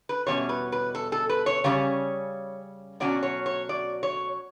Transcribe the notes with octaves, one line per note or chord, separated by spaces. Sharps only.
B4
E2 B2 G3 C#4 C#5
B4
B4
A4
A4
B4
C#5
C#3 G3 C#4 C#5
B2 F#3 C#4 D5
C#5
C#5
D5
C#5